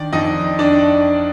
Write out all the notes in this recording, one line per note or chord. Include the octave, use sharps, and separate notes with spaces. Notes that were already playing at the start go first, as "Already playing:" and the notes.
Already playing: D#3 D4 D5
F2 D#4 D#5
D4 D5